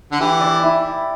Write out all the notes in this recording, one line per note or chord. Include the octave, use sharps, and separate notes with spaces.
D3
E3 G4
D5
E4